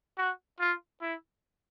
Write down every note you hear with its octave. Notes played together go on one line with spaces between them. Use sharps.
F#4
F4
E4